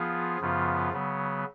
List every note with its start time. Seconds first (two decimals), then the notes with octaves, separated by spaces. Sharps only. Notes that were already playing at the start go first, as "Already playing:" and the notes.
Already playing: F3 B3 F4 G#4
0.40 F#2 C#3 F3 B3 F4
0.92 C#3 F#3 B3